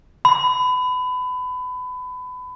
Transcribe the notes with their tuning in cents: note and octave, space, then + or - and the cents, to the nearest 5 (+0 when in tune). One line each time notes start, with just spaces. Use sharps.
B5 +25